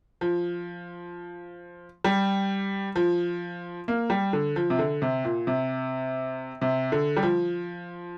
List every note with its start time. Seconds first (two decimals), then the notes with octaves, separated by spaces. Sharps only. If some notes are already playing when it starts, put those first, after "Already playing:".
0.21 F3
2.04 G3
2.96 F3
3.88 A#3
4.10 G3
4.33 D3
4.56 F3
4.70 C3
4.79 D3
5.02 C3
5.25 A#2
5.47 C3
6.62 C3
6.92 D3
7.16 G3
7.23 F3